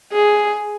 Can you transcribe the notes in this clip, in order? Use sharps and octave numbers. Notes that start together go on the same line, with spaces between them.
G#4